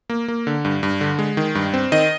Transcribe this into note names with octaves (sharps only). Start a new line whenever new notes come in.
A#3
A#3
D3
G2
G2
D3
G#3
D#3
G2
C4
D#3 D#5